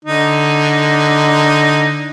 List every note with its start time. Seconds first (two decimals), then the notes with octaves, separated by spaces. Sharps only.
0.05 D3 D#4